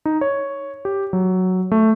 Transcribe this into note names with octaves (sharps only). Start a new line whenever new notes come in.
D#4
C#5
G4
F#3
A3